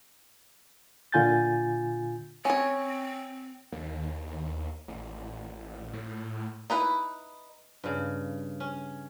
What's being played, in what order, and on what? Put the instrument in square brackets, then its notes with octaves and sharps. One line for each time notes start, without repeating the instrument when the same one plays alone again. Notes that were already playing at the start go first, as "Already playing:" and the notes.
[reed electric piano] A#2 D3 F4 G#5 G6 A6
[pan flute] C4 [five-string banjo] C#4 C#5
[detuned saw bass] D#2
A1
A2
[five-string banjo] D#4 E4 B4
[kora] G2 C#3
C#4